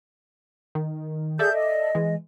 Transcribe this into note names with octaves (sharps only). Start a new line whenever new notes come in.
D#3
G#4 A4 D5 E5 G6
D#5
E3 G#3